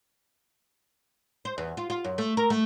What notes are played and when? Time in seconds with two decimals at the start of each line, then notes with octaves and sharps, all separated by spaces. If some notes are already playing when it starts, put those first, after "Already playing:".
1.45 C5
1.58 E2
1.77 F4
1.90 F4
2.04 F#2
2.18 A3
2.37 A#4
2.50 A3